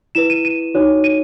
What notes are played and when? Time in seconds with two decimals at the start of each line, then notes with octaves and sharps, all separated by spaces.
0.15 E4 B4 E7
0.30 D#7
0.45 D#7
0.74 D#4 F#4 C#5
1.04 D#7